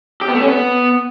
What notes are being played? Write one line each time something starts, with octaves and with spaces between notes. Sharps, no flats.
G4
B3
A3
C#4
B3